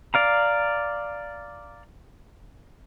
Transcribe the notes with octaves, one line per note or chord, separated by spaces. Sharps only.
D5 F5 A#5